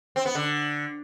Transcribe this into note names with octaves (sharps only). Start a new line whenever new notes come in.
C4
B3
D3